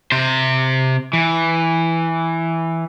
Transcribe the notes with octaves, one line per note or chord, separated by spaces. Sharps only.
C3 C5
E3